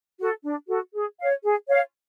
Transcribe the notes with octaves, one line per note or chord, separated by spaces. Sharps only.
F#4 A4
D4
F#4 A4
G#4
C#5 F5
G#4
C#5 F5